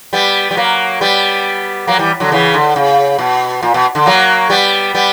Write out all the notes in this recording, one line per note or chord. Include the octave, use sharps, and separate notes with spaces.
G3 B3
G3
F#3 A#3
G3 B3
F#3 A#3
E3 G3
D3 F#3
C#3 E3
D3
C#3
B2
A#2
B2
D3
F#3 A#3
G3 B3
G3 B3